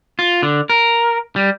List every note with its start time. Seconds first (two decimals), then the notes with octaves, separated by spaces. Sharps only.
0.19 F4
0.43 D3
0.70 A#4
1.36 G3